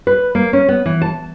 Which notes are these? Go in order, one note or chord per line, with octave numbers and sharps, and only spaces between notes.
B4
A#3
C#4
B3
E3
A5